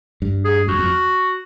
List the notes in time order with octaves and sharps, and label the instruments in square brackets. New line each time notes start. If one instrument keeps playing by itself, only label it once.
[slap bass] G2
[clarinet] G#4
[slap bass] F2 [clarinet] F#4
[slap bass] F2